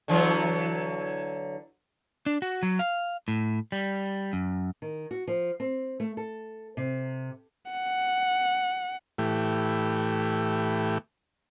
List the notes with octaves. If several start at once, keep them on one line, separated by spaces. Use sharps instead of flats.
D3 E3 F#3
D4
F#4
F#3
F5
A2
G3
F#2
D#3
F#4
F3
C4
A3
A4
C3
F#5
A2 E3 A3 G4